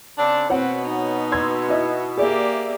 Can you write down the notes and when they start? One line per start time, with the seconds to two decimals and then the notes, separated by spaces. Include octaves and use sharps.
0.17 C#3 C4 D4
0.50 B2 C4 B4 C#5 F#5
0.85 D#4
1.32 C6 E6 G#6
1.69 E4 D#5
2.17 A#3 G4 G#4 D5 E5